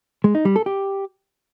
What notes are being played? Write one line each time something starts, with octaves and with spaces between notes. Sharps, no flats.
G#3
D#4
G3
A4
G4